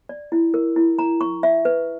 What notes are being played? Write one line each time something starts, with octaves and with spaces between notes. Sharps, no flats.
D5
E4
A#4
E4
A#5
C#6
E5
B4